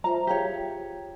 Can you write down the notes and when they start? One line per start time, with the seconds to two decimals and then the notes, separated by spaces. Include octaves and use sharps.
0.04 F4 C5 E5 A#5
0.27 G4 G#4 C#5 F5